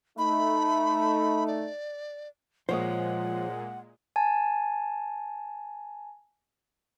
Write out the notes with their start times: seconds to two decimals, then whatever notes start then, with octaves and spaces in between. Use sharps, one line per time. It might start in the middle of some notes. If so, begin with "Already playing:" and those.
0.18 A3 D#4 B5
1.48 D5
2.69 A#2 F3 G#3 C5 C#5 D#5 F#5
4.16 G#5 A5